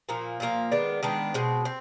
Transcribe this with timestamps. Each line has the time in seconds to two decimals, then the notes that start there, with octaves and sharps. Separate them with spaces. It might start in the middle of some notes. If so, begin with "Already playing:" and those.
0.09 A#2 F3 A#3
0.40 A#2 F3 A#3
0.72 D#3 G#3 B3 D4
1.03 D#3 G#3 B3 D4
1.34 B2 G#3 C4
1.65 C4